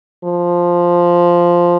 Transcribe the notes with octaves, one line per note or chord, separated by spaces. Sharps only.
F3